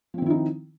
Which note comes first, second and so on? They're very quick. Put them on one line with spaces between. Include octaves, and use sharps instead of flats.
F3 C4 D#3 E4 D#4